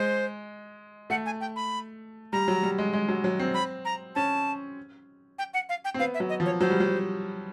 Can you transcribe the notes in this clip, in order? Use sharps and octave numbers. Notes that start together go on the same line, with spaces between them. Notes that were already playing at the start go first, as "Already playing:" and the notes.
Already playing: G#3 C5
A3 F#5
G#5
G5
B5
G3 A#5
F#3
G3
G#3
G#3
F#3
F#3
C4
B5
A#5
C#4 A5
G5
F#5
F5
G5
C4
B3 F5
E5
F#3
D#5
F3
C#5
F#3 C5
G3
F#3